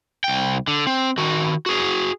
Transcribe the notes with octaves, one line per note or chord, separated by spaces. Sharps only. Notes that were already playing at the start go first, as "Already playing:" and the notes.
C2 G5
D3
C4
D#3 F#4
F#4 G#4